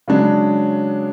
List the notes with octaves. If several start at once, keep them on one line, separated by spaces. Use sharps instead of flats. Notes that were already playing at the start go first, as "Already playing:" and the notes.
C#3 F#3 G#3 D4